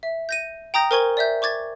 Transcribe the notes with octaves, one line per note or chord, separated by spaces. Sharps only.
E5
G6 A#6 D#7
G5 A#5 D#6 G6 A#6
A#4 C5 G#5 C#6 G#6 G7
D5 E5 G6
C#6 D6 G#6 A6